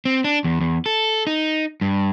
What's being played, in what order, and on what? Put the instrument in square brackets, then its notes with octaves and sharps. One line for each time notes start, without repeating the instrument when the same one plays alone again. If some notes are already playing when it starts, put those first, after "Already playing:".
[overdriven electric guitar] C4
D4
E2
E2
A4
D#4
G2